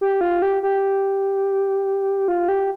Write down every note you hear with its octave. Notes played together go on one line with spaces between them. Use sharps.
G4
F4
G4
G4
F4
G4